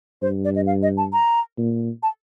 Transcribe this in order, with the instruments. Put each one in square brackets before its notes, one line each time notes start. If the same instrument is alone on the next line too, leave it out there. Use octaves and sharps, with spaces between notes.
[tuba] G2 [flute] C5
[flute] D5
D#5
F5
D#5
A5
A#5
[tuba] A#2
[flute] A5